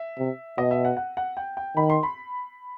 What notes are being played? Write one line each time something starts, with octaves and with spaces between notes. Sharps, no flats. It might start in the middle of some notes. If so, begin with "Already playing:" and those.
Already playing: E5
C3
B2 D#5
E5
F#5
F#5
F#5
G5
G5
D#3 B5
C6
B5